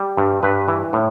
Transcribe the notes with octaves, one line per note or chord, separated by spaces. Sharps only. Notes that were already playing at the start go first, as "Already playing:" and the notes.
Already playing: G3
G2
G2 B4
E3
A2